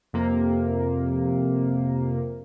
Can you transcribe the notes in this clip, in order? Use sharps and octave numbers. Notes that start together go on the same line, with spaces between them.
F2 C3 A#3